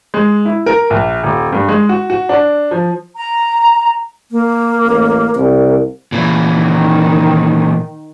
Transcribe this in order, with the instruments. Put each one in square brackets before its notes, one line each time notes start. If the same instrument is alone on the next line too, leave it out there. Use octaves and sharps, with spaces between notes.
[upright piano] G#3
E4
A#4
A#1
D#1
G2
G#3
F#4
F#4
D4
F3
[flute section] A#5
[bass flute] A#3
[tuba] A1
[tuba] C2 [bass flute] A#4
[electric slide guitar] A#2 E3
[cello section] D#3